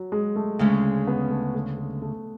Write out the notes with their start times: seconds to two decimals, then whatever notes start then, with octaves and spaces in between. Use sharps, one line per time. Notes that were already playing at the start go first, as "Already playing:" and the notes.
Already playing: F#3
0.12 G#3
0.36 A3
0.59 D2 C#3 G#3 C#4
1.07 B3
1.30 A3
1.55 A3
1.78 A3
2.02 A3